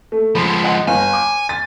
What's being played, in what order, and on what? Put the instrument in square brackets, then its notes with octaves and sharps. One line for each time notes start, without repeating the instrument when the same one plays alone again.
[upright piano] A3
[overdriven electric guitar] F3 G#3 [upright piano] B5
[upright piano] D#5 F#5
[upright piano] G1 [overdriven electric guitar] G#5
[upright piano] D6
A6